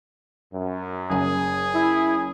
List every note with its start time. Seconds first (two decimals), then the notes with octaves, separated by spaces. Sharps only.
0.53 F#2
1.10 F#1 G#4 G#5
1.75 E4